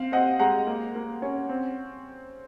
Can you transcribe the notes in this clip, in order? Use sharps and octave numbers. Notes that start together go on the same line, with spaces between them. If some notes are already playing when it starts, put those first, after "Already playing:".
Already playing: C4 F5
C4 D#5 F#5
G#3 F#5 A#5
A#3
A#3
C#4
C4